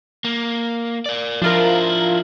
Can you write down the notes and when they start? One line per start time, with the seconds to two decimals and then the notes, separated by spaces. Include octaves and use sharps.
0.24 A#3
1.06 A#4 D5
1.42 F3 D4 E4 F4 A#4